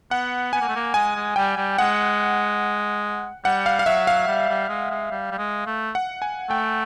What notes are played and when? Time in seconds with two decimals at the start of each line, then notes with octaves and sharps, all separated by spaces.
0.11 B3 F#5
0.53 B3 G#5
0.61 A#3
0.68 A3
0.76 A#3
0.94 G#3 G#5
1.15 G#3
1.36 G3 G5
1.57 G3
1.78 G#3 F#5
3.44 G3 F#5
3.66 F5
3.79 F5
3.86 F#3 E5
4.07 F5
4.28 G3
4.49 G3
4.69 G#3
4.90 G#3
5.11 G3
5.31 G3
5.38 G#3
5.67 A3
5.95 F#5
6.22 G#5
6.49 A3 G5